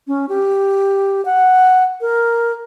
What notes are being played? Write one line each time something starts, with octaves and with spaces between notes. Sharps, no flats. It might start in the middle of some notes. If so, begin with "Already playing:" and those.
C#4
G4
F#5
A#4